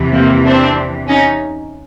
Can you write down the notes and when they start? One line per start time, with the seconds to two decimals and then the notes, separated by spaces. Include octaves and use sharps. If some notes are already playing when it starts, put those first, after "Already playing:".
Already playing: E2 C3 E3
0.13 A#3 C4
0.45 C4 D4
1.08 C#4 D#4